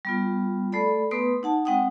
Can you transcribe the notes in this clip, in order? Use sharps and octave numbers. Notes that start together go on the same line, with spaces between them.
G3 B3 F4
A3 A4 D5 B5
A3 B3 B4 C6 D#6
D#4 F#5 A5
G#3 C4 F#5 G5 D#6